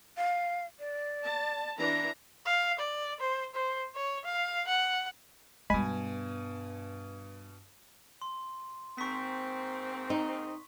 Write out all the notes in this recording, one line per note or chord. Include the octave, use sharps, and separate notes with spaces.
F5
D5
A5
E3 D4 A#5
F5
D5
C5
C5
C#5
F5
F#5
G2 B2 G3 G#3 B3 G#5 B5 B6
C6
G#2 A#3 C4 C#6 B6
D#4